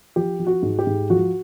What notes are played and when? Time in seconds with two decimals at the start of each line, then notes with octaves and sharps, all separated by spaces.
0.16 F3 G4
0.39 F3
0.47 F#4
0.63 G#2
0.79 G4
0.87 G#2
1.10 F3 F#4